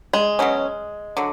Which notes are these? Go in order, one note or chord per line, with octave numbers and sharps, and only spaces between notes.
G#3
B2 F#3 C#4
D3 F#3